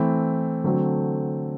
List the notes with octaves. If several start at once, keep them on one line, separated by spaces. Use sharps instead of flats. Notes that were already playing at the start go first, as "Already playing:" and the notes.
Already playing: E3 A3 C4 E4
D3 F#3 A3 C4